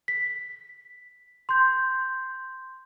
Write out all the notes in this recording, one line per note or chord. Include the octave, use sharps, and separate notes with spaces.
B6
C6 G6